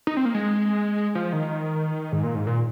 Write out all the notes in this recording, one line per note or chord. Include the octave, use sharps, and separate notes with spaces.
D#4
C4
A#3
G#3
F3
D#3
G#2
A#2
G#2
A#2